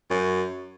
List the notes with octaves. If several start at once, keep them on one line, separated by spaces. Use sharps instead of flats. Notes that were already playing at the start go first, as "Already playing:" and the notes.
F#2